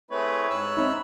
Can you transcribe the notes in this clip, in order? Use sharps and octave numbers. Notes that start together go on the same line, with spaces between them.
A3 C4 E4 G#4 B4 C#5
G#2 C#5 E6 F#6
C4 C#4 D#4 E5 B5